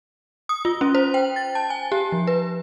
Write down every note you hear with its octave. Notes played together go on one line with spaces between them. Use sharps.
D#6
F4
C#4
C5
G5
A6
A5
G#5
G4
F3
B4